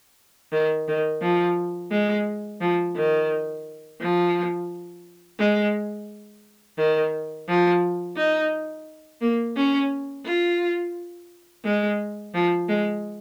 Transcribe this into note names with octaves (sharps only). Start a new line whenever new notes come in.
D#3
D#3
F3
G#3
F3
D#3
F3
G#3
D#3
F3
D#4
A#3
C#4
F4
G#3
F3
G#3